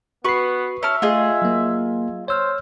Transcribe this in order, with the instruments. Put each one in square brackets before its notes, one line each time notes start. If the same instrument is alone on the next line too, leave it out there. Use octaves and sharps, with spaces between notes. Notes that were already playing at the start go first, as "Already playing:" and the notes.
[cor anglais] B3 [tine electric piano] F#4 C7 [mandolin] B4 C#6
[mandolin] C#4 A5 F6 [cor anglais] E5
[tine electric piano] A3 [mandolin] F4 G#4 D#5
[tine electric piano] F#3 A#3
[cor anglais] C5 [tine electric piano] C#5 E6 F6